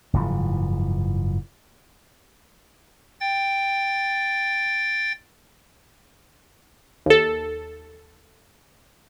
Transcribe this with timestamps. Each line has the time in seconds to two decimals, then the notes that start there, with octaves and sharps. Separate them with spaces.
0.14 F#1 G#2 E3 F3
3.20 G5 A6
7.06 D#2 A4